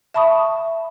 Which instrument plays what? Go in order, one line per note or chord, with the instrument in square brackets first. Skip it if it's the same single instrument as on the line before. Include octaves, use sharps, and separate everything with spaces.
[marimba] E5 A5 B5 C#6 D#6